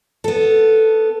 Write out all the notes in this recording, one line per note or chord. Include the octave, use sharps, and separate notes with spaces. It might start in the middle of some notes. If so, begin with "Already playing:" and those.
B3 A4